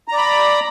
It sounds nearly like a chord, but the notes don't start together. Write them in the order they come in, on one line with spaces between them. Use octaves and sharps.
A#5 D5 B5